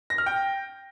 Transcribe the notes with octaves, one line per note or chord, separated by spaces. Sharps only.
A#6
F6
G5